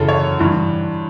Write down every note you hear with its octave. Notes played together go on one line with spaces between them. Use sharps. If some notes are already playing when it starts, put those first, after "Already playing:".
Already playing: F#2 C#3 E3 A4
C#5
G2 E3